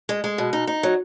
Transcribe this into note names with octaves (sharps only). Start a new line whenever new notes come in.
G#3
G#3
B2
D#4
D#4
F#3